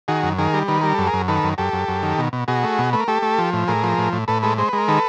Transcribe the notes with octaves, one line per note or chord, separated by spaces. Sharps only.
D#3 F#4 G#4
F#2
D#3 G#4 A#4
G3
D#3 B4
G3 A#4
F#2 A4
G#4 A#4
F#2
D#3 A4 B4
F#2
F#2 G4 A4
F#2
F#2
D#3
B2
B2
B2 F#4 G#4
A3
B2
A3 B4
A#4
A3 G4 A4
A3
F3
A2
A2 G#4 A#4
F3
A2
A2
A2 A4 B4
G#3 A4 B4
G#3 C5
G#3 B4
A#4
D#3 A4 B4